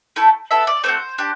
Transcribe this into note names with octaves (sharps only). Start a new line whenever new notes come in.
A3 E4 A4
B3 E4 A4 E5
D5
A3 C4 F#4 C5
D4 G4